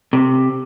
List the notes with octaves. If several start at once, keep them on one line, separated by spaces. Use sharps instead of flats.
C3